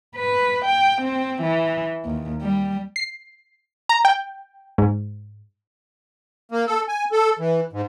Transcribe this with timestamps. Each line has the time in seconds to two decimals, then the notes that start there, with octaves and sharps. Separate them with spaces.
0.16 B4
0.66 G5
1.02 C4
1.43 E3
2.05 D#2
2.42 G3
2.96 C7
3.89 A#5
4.05 G5
4.78 G#2
6.52 A#3
6.67 A4
6.88 G#5
7.12 A4
7.39 E3
7.73 G#2